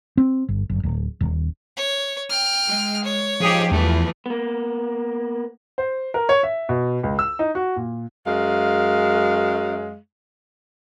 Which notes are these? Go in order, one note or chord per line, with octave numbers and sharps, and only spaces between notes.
C4
G1
F#1
D1
D#1
C#5
G5 F6
G#3
C#5
F3 D#4 G4 G#4
E2 E3 F3 A3
A#3 B3
C5
A#4
C#5
E5
B2
C#2
E6
D#4
F#4
A#2
F#2 G#3 F5